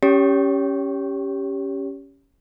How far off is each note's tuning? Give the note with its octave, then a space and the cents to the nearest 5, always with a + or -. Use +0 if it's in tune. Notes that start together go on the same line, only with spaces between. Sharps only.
C#4 +5 G4 +0 C#5 +30